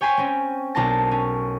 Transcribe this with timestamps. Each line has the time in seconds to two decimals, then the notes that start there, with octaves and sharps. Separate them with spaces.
0.01 C#5 G5 G#5 B5 C6
0.17 C4 C#4
0.75 B1 D4 A#4 C5 A5 A#6
1.11 C#4